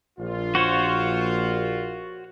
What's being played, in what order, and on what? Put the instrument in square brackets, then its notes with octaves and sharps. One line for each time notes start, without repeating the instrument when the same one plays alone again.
[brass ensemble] A#1 F4
[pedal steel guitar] F#4 C5 C#5